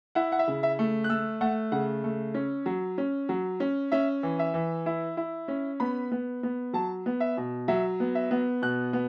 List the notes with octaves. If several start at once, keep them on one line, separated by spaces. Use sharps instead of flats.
E4 F#5
F#5
E5
C#3
E5
A3
F#6
A3 E6
A3 F#5
C#3 F#5
A3
C#4
F#3
C#4
F#3
C#4
C#4 E5
E3
E5
E3
E4
E4
C#4
B3 B5
B3
B3
F#3 A5
B3
E5
B2
F#3 E5
B3
E5
B3
B2 F#6
B3